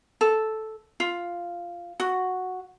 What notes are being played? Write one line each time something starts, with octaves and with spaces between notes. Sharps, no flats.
A4
F4
F#4